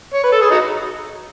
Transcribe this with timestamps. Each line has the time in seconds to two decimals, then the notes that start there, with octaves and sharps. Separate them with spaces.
0.14 C#5
0.24 B4
0.32 A4
0.41 G#4
0.51 D#4 F#4